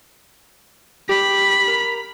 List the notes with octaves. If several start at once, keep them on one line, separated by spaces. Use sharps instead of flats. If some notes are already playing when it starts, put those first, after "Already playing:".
G4 B5
A#4